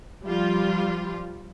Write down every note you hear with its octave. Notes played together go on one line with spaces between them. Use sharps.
F3 G3 F4